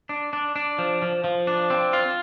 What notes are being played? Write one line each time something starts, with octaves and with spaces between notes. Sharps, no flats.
D4
D4
D4
F3
F3
F3
D4
C4
F4